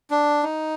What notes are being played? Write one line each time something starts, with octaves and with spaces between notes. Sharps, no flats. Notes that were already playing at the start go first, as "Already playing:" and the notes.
D4
D#4